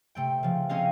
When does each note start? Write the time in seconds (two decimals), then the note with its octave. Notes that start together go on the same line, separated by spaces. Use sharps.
0.15 C3 A3 G5
0.43 C#3 F3
0.69 G#3 C4 C#4 G#4 D#5 F5